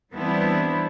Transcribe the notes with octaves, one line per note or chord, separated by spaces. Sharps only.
E3 G3 B3 C4 D4 E4